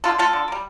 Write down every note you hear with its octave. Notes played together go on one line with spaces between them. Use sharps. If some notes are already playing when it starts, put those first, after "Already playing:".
D3 F4 A4
A3 F4 A4
D3
A#3
G3